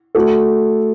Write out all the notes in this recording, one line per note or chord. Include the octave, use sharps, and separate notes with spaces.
A3 F#4 A4